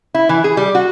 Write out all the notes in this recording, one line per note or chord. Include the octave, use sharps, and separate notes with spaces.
E4
E3
G#4
G3
F#4